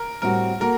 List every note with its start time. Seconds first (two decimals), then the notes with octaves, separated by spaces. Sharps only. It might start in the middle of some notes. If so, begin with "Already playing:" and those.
Already playing: A#4
0.22 A2 G3 C4 F#4 A#4
0.60 A#3 F#4 A4 A#4